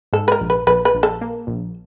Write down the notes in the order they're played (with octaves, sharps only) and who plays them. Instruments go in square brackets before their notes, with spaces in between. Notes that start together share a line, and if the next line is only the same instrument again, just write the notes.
[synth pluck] G#2 [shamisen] A4
[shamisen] B4
A#4
[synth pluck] A#1
[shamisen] B4
[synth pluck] A#1 [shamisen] B4
[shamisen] B4
[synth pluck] A#1
[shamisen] A4
[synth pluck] A#3
A#1